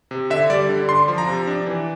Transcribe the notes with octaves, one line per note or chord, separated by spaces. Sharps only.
C3
D3 E5
G3 D5
D3
D4 C6
F3
A#5
C3
D4
E3